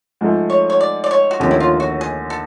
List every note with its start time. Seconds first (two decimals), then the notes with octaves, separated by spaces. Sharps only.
0.21 G#2 F3 A3
0.50 C#5
0.70 C#5
0.81 D5
1.04 D5
1.11 C#5
1.31 F#4
1.40 D#2 D3 F3 A3 C#4 G4
1.51 E4
1.60 F4
1.80 F#4
2.01 G#4
2.30 A4